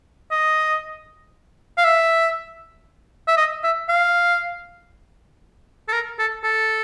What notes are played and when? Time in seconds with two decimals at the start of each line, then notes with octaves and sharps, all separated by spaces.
0.31 D#5
1.78 F5
1.84 E5
3.28 E5
3.37 D#5
3.63 E5
3.89 F5
5.88 A4
5.92 A#4
6.19 A4
6.44 A4